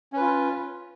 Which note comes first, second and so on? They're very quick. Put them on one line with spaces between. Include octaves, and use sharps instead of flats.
C#4 B4 F4